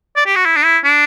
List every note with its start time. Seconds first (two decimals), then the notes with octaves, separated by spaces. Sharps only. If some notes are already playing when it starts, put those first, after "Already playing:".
0.16 D5
0.26 G4
0.36 F#4
0.45 E4
0.56 D4
0.65 E4
0.84 D4